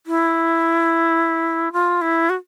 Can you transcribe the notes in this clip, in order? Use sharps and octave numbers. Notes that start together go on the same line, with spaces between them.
E4
F4
E4
F#4